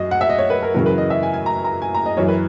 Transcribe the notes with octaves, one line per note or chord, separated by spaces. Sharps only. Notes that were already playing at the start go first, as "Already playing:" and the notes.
Already playing: F#2 F#3 D#5
F#5
E5
D#5
C#5
B4
A#4
F#2 C#3 E3 A#4
B4
D#5
E5
G#5
G#5
A#5
A#5
G#5
A#5
D#5
F#2 E3 C#5
B4